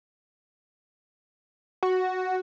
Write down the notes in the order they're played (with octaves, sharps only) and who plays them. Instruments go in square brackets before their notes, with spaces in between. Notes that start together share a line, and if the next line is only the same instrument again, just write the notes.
[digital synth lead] F#4